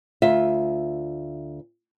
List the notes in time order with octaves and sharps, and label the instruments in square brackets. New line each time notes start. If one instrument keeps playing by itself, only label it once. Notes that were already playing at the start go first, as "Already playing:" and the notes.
[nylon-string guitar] D2 F4 E5